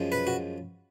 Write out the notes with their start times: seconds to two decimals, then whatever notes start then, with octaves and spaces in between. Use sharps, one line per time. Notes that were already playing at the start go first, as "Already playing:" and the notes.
Already playing: F#2 F3 G#3
0.12 B4
0.27 F#4